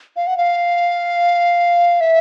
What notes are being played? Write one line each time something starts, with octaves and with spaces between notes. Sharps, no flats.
F5
F#5
F5
E5